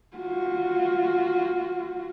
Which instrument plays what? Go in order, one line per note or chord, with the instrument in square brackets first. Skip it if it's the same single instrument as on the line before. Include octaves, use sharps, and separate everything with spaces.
[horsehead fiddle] F4 F#4